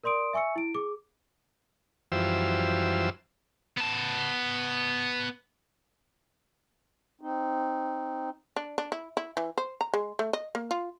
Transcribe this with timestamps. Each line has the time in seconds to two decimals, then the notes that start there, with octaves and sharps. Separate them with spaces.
0.04 A#4 D5 C6 D#6 D7
0.33 E5 G#5 C#6 E6 C#7
0.56 E4 D7
0.75 G#4 D6
2.12 F#2 E3 F3 G3 C5 E6
3.78 B3 A5
7.21 C4 D#4
8.56 D4
8.78 D4
8.92 E4
9.17 E4
9.37 E3
9.58 C5
9.81 A#5
9.94 G#3
10.19 A3
10.33 D#5
10.55 A#3
10.71 F4